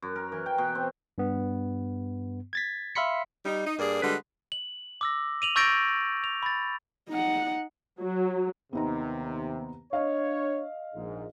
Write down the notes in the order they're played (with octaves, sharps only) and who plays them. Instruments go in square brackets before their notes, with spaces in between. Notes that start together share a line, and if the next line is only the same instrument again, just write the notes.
[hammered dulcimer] F#2
A#4
E3
G5
B2
C4
[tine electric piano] G2 B3
G#6 A6 B6
E5 F5 B5 C6 B6 C#7
[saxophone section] G3 D#4
D#4
G2 A#3 G#4 D5
D3 G3 G#3 F#4 B4
[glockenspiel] F#7
D6 E6 A#6
D#7 F7 F#7
C#6 E6 G6 A6 A#6 D7
F7
B5 A6
[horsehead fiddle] D#4 F#5
[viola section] F#3
[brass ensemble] D#2 C3 [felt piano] B3 D#4 A#5
[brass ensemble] D4 C#5 [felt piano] D#5 F5
[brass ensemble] A#1 G#2